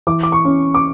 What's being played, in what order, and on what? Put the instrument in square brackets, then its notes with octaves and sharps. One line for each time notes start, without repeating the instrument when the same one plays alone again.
[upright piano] E3 [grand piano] D6
[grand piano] D6
C#6
[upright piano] C#4
[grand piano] D6